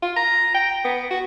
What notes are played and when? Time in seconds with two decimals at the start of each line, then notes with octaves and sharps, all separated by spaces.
0.02 F4
0.16 A#5
0.54 G5
0.84 B3
1.11 F#4